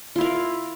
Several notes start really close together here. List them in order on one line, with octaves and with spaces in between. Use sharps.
F4 E4 F5 A#4